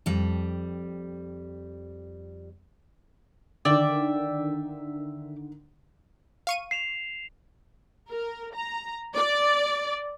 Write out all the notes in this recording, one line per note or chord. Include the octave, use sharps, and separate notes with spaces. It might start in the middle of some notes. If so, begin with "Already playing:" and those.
F2 G3
D3 D#3 D5 E5 G5
F5 C#6 D#7
C7 E7 F7
A#4
A#5
D5